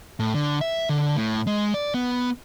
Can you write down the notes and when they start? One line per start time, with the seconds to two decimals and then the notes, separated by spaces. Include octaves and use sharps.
0.20 A2
0.34 D3
0.61 E5
0.89 D3
1.16 A2
1.47 G#3
1.74 D5
1.94 B3